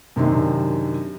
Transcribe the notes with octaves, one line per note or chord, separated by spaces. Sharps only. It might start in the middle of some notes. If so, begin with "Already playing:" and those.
F#2 C3 D#3 D4